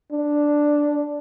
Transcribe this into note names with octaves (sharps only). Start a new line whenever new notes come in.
D4